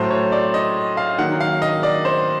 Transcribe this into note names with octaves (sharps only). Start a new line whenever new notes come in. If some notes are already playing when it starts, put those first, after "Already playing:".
Already playing: A2 F#3 A3 C5
C#5
D5
D#5
F5
D#3 F#3 A#3 F#5
F5
D#5
D5
C5